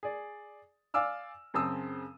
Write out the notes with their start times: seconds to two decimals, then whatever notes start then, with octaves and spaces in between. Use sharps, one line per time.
0.03 G#4 D5
0.94 D5 F5 G#5 D6 E6 F6
1.54 F#2 C#3 C4 A5 D#6 E6